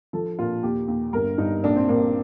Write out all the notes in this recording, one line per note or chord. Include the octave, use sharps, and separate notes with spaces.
F3 A4
A#2 F4
D#2 G4
D#2
G1 A#4
G2 D#4
A#1 D4
C4
A#1 A#3